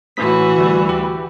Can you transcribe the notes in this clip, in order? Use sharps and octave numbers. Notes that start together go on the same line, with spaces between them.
A2 E3 F#4 B6
D2 G3
G4